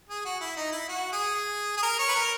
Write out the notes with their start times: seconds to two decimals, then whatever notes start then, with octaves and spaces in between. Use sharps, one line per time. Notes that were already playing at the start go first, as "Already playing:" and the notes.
0.09 G#4
0.25 F#4
0.41 E4
0.57 D#4
0.72 E4
0.88 F#4
1.13 G#4
1.77 G#4
1.83 A#4
1.99 C#5
2.08 B4
2.15 A#4